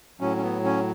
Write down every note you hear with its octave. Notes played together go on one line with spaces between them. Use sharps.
A2 F#3 C#4
C#4
B3
C#4